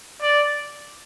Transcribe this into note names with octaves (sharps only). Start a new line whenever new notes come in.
D5